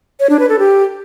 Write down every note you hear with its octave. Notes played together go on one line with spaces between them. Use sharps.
C#5
D4
B4
A4
G4